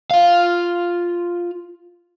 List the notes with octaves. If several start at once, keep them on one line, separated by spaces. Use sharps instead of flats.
F4 F5